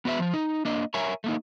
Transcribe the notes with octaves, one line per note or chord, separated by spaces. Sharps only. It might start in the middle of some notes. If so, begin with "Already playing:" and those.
B3 F#4 B4 E5
F3 F4
D#4
A#3 D4 D#5
A#4 C#5 E5 G#5
A3 A#3 D#4